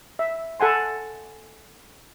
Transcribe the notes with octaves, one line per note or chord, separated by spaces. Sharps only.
E5
A4 F#5 G#5 C6